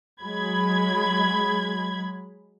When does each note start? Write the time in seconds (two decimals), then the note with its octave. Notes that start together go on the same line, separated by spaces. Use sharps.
0.22 F#3 G#3 B5 G#6